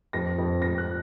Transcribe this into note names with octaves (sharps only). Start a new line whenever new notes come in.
F2 A#6
F2
F2 A#6
F#6